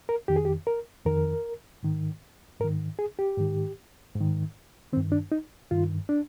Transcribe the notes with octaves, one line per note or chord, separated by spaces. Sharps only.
A#4
F2 D#3 G4
G#4
G4
A#4
F2 D#3 A#4
G#2 D#3
G#2 D#3 A#4
G#4
G4
G#2 D#3
G#2
D#3
G2 D#3 C4
D4
D#4
G2 D#3 F4
D4